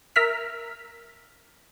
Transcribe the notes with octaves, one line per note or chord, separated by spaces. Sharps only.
A#4 E5 F6 B6